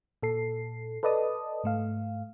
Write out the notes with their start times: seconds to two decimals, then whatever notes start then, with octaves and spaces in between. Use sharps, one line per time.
0.23 A#2 A4 C7
1.03 A4 B4 D5 D#5 A5 D#6
1.64 G#2 A3 F5